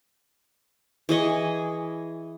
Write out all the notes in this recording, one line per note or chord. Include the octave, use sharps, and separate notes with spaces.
E3 G#4 D#5 C#6